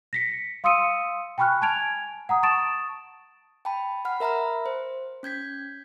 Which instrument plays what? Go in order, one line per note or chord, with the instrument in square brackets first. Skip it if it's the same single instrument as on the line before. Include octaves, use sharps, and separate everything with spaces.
[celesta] A#6 B6 C#7
F5 C6 D#6 E6 C#7 D#7
G5 G#5 B5 C#6 F6 F#6
G#5 A5 G#6 D7 F7
F#5 A#5 D#6
A5 C#6 D#6 A6 D7 E7
[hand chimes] G5 A5 B5
F#5 B5 F6
A#4 E5 A#5 B5 F6
C5
C#4 G6 G#6 B6